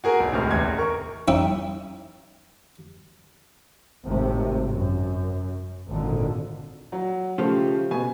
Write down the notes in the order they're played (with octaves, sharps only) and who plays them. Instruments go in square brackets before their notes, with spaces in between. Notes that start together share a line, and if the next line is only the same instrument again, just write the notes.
[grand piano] F#4 G#4 A#4
B1
D1 C3 G#3 F6
A1 E2 G#6
A#4 C#6
[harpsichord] C#4 D#4 E4 E5 G5
[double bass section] G#1 A2 C3
F#2
G#1 A#2 D3
[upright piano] F#3
[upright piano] C#3 G4 [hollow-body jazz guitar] F3 A3 F4
[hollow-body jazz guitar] B2 [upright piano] G#5